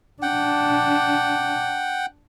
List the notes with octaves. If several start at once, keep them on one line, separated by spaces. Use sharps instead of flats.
D4 F#5 G5